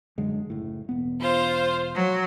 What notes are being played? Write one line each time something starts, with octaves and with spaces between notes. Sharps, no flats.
F#2 D3 G#3
F#1 A2
E1 B3
F4 C5
F#3